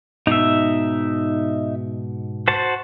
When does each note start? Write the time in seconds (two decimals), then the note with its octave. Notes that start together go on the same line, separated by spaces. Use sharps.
0.27 G#2 B2 D#4 E5
2.48 F#4 C5 A5